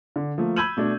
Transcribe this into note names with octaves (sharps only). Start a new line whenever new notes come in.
D3
F3 A3 A#3
B5 E6 G6 G#6 D#7 F#7
B2 A3 D4